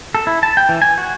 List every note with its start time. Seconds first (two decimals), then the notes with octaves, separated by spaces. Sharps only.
0.15 A4
0.27 E4
0.43 A5
0.57 G5
0.69 E3
0.82 G#5
0.98 F#4